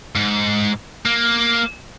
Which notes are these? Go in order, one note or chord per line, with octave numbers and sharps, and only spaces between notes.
G#2
A#3